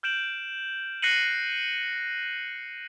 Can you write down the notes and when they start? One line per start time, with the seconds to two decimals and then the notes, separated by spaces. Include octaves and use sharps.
0.03 F6 G6 D7 E7 F#7
1.02 F#6 A#6 C7 C#7 D#7 F#7